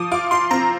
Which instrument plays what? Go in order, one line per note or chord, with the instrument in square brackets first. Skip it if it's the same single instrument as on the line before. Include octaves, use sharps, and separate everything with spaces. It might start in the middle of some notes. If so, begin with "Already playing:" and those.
Already playing: [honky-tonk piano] F3 [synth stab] D6 D#6
[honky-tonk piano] F4 [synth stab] D6
[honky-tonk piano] F4 [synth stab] C6
[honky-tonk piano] C4 [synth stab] A#5